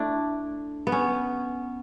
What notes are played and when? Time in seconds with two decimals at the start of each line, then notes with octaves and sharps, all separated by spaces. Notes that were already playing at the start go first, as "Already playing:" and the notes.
Already playing: A3 D4 E4
0.87 B3
0.92 C#4